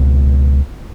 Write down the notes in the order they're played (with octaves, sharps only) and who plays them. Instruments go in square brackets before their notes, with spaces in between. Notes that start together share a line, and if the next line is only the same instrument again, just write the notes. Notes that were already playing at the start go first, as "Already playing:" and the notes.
Already playing: [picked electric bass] C#2 B2